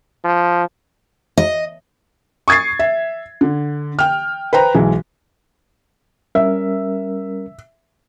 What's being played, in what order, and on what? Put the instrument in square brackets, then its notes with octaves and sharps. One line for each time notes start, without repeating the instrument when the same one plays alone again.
[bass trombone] F3
[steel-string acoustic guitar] D#5
[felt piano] C#6 D#6 G#6 A6 C7
E5
D3
G5 F6
B4 C5 G5 A#5
B1 E3 G#3
[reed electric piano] G3 C#4 A#4 [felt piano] E5